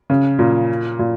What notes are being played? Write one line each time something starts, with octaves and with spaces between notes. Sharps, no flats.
C#3
A#2
A#2